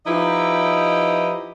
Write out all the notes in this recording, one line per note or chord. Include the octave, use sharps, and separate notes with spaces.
F3 D#4 E4 G4 B4 D#5